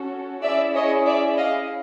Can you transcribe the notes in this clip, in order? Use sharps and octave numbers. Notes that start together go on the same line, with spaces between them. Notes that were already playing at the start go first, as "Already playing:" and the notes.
Already playing: C#4 F#4 A4
C#4 E4 G#4 D5 E5
C#5 D#5
D5 E5
D#5 F5